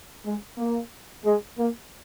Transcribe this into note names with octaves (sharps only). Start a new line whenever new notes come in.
G#3
A#3
G#3
A#3